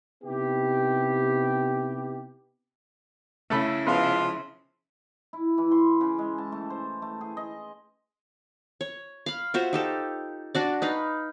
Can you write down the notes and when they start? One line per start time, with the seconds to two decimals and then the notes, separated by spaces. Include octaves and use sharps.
0.22 C3 B3 D#4 E4 G4
3.50 C#3 A3 E4 A4 B5
3.86 F3 G#3 B3 F4
5.33 E4
5.58 E3
5.72 C6
6.01 C#3
6.18 G#3
6.38 A5
6.52 A3
6.70 C5
7.02 A3
7.21 G#4
7.37 D#5
8.81 C#5
9.26 F5 B5
9.54 F4 F#4 C5 E5
9.73 D#4 G4 A4
10.55 D4 F#4 D5
10.82 D#4 B4 F5